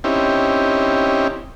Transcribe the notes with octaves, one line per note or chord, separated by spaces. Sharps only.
C4 C#4 D#4 E4 G4